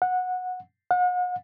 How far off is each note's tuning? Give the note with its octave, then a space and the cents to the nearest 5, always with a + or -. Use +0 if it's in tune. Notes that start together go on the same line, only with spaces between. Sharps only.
F#5 -15
F#5 -40